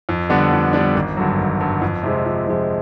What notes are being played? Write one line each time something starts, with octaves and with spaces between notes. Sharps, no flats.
F2
D3 G3 B3 D4
F2
D3 G3 B3 D4
G#1
G2 D3 F#3
G#1
G2 D3 F#3
F2
C3 F3 G#3
F2
C3 F3 G#3